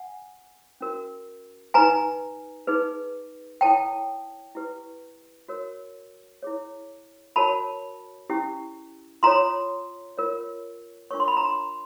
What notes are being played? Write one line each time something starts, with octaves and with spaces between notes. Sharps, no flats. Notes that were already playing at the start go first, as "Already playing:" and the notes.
Already playing: F#5 G#5
C#4 F#4 A#4
D#4 G4 B4 G#5 A#5
D#4 G#4 B4
E4 A4 C#5 G5 A5
E4 G4 B4
F#4 A#4 C#5
E4 G#4 C#5
F#4 A#4 C#5 A5 B5
C#4 E4 G4
F4 A4 C#5 A#5 C6
F4 A#4 C#5
D4 F4 A#4 C#5 C#6
C6
B5
A#5 C6